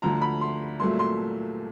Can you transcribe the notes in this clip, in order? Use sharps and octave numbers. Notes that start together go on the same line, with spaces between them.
D2 D3 F3 A#5
B5
C6
C2 A#2 F#3 A3 C6
C6